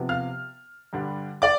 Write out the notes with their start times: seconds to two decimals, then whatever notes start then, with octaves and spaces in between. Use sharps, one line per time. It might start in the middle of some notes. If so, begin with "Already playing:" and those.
Already playing: C3 F3 B3
0.09 F5 F6
0.93 G2 D3 G3 D4
1.42 D5 D6